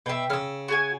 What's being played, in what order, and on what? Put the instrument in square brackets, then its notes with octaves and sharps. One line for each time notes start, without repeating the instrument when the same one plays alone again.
[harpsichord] B2 [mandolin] E5 G5
[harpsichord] C#3 [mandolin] E6 F6
[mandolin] F#4 G#4 G#5